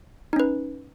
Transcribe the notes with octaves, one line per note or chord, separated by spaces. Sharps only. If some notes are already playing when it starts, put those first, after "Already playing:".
C#4 D#4 B4